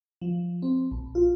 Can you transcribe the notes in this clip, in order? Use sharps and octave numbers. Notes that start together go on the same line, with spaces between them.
F3
C4
A#1
F4